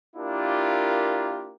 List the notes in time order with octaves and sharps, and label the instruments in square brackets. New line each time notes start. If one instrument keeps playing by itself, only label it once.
[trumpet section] A#3 D4 E4 F4 G4 A#4